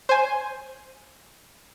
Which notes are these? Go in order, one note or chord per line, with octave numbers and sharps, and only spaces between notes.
C5 G#5